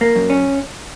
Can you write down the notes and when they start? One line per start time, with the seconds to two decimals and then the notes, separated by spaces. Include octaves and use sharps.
0.01 A#3
0.16 F#2
0.30 C#4